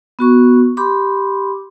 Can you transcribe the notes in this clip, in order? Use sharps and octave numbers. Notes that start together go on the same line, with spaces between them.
B3 F#4 C#6
G4 B5 C6 D6